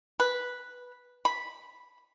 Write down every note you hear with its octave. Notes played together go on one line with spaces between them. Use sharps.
B4
B5